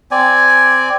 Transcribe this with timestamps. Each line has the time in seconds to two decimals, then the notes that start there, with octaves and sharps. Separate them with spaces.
0.11 C4 D5 G#5